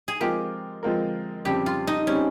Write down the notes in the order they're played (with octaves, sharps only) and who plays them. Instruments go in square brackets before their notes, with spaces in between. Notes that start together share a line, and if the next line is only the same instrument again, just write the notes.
[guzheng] G#4
[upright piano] F3 G#3 C4 F4 A#4 [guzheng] G4
[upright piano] F3 G#3 C4 F4 A#4
[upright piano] F2 C#3 G3 C4 [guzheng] G4
[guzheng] F4
D#4
[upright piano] C#3 G3 C4 [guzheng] C#4